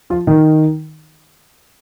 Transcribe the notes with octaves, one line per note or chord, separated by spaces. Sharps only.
F3 F4
D#3 D#4